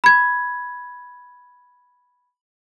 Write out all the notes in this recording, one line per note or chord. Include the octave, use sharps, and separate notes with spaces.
B5 G#6